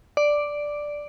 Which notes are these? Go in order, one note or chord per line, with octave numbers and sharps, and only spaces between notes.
D5